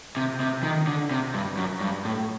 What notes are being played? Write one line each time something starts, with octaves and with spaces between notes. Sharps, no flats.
C3
C3
D#3
D3
C3
G2
F#2
G2
A2